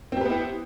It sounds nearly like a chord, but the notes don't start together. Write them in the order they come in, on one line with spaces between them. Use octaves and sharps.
C4 G4 B4 B3 E4